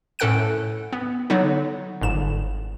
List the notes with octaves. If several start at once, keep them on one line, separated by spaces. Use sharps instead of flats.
A2 C#4 A4 F#5 F#6 D7
B3
D3 F#3 B3 D#4
G1 G#2 E7